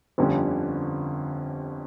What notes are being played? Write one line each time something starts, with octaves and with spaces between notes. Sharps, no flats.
G1 F2 D3 G3 C#4